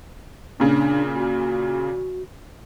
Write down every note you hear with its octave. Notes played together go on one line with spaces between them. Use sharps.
A#2 C#3 D4
F#4